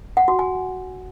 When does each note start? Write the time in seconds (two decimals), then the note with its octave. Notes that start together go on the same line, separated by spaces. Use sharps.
0.17 F#5
0.28 F#4
0.39 G#5